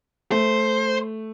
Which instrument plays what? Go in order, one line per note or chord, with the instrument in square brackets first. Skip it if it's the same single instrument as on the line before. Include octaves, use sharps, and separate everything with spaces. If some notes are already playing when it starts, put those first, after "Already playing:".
[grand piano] A3 [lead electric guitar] C5